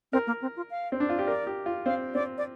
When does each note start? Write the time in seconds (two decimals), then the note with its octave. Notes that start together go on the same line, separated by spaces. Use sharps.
0.12 C4 A#4
0.27 A#3
0.42 C4
0.56 F4
0.70 F5
0.92 C4
1.00 D4
1.09 F4
1.18 G4
1.27 A#4 D5
1.47 G4
1.66 F4
1.86 C4 F5
2.14 C4 D5
2.38 D5